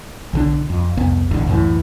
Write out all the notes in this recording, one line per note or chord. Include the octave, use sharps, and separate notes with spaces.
B1 D3 D4
F2
C2 F2 B3
A1 E2 G#2 D3
C#2 F#2 A2 E3